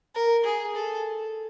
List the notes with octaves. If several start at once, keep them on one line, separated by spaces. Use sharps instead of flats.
A#4
G#4
A4